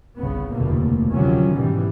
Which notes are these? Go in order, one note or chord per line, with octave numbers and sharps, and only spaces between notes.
G1 C2 C#3 B3
F1 D#2 B2 D3 A3 A#3
D2 C3 D#3 F3 F#3 C#4
G#2 B2 E3 G3